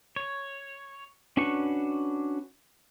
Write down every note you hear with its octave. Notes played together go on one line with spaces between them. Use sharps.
C#5
C#4 D4 F#4 B4 C#6